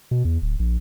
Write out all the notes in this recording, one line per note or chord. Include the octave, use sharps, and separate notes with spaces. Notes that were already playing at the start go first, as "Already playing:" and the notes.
B2
E2
D1
A#1